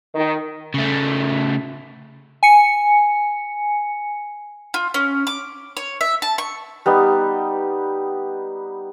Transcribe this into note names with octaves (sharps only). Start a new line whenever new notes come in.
D#3
C#3 A3
G#5 C#7
F4
C#4
D6
C#5
E5
A5
C#6
G3 B3 D#4